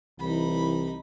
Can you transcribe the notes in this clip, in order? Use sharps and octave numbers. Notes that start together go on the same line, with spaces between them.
C2 E3 D#4 B5